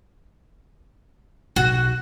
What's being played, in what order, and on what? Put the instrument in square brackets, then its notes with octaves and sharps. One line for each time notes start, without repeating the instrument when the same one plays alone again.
[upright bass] B1 [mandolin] F#4